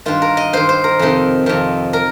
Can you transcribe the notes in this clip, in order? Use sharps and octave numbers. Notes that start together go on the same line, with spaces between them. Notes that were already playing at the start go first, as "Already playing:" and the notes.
G2 D#3 F4
A#4
D#5
G2 D#3 C5
C5
A#4
F2 C3 D#3
F2 C3 D#3
A#4